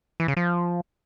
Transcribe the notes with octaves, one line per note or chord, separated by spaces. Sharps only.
E3
C#3
F3